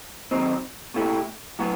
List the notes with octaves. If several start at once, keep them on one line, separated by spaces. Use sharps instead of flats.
D#3 F#3 C4 D#4
B2 A3 E4 G4
A2 F#3 B3 F#4